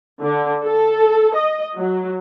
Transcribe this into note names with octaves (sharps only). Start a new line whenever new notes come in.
D3
A4
D#5
F#3